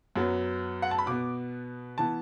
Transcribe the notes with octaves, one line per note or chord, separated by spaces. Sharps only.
F#2 F#3 B3
F#5
A5
B5
B2 B3 D6
E3 B3 A5